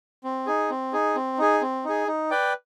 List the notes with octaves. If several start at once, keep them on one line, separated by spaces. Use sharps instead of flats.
C4
D#4 G#4
C4
D#4 G#4
C4
D#4 G#4
C4
D#4 G#4
D#4
B4 D5 G5